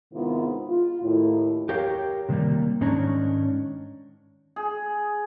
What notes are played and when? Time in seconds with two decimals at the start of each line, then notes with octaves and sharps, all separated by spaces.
0.13 G#2 C3 D#3 B3 E4 F4
0.68 F4
1.02 D#2 A2 E4
1.69 G4 A#4 C#5 F5 G5
2.29 C3 D#3 F3 G3 A#3
2.81 G#2 D#3 C#4 D4 C#5 A#5
4.56 G#4